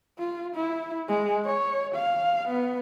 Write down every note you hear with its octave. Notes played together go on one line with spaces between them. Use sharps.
F4
E4
G#3
C#5
F5
B3